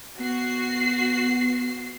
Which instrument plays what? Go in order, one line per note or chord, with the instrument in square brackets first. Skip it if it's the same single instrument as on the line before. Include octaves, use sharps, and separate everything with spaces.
[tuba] B3 [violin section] F#4 C7